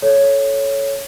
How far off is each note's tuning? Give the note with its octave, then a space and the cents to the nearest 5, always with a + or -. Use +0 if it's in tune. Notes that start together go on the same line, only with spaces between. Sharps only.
A4 -10 C#5 +0